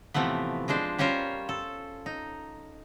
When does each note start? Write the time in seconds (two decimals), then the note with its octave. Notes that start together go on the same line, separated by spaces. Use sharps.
0.14 A2 C3 E3 F3 A3 B3
0.68 F3 G#3 D4 C5
0.98 G3 C#4 F4 A#4 C5
1.49 A4
2.06 D#4